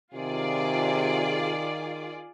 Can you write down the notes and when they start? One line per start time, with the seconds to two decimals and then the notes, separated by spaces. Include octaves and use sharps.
0.14 C3 D#3 F4 G#4 D5